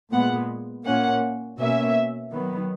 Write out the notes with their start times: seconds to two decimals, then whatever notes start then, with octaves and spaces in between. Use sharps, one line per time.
0.12 A#2 G#3 B3 F#5
0.85 A#2 A#3 C#4 F#5
1.60 B2 A#3 C#4 E5
2.32 D#3 F#3 B3